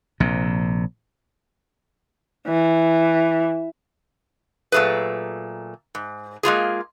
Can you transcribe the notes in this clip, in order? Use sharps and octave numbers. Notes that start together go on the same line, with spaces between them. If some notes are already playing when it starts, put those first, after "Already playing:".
A#1 C3
E3
A#2 F#3 A3 G#4 B4
G#2
G#3 A#3 F4 G#4